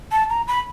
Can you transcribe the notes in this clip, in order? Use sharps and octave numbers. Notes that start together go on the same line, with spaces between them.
A5
A#5
B5